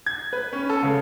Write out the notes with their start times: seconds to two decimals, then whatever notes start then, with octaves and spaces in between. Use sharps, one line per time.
0.06 G#6
0.33 B4
0.53 C#4
0.69 A4
0.83 C#3